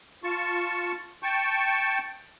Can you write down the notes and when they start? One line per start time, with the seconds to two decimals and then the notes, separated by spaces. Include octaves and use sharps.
0.23 F4 A5 C#6
1.23 G5 A5 C#6